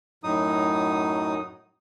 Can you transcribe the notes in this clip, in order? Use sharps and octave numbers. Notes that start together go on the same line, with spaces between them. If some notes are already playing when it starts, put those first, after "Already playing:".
F#2 A2 F#3 D#4 D#6